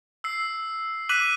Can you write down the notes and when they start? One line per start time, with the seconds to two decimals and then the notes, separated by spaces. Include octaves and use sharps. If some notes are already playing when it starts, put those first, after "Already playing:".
0.24 E6 C7
1.09 D6 F#6 B6 D#7 F#7